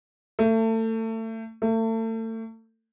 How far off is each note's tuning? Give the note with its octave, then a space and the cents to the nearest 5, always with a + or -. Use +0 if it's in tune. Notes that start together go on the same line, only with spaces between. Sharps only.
A3 +30
A3 +35